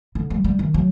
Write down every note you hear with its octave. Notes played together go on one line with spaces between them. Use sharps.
D3
G3
G3
D#3
F#3